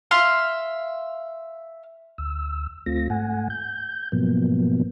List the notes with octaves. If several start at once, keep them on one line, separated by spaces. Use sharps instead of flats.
E5 F5 C6
D2 E6
D2 A3 C4 F4 A#6
G#2 A3 F#5 G#5
G6
G#2 B2 F3 F#3 A#3 B3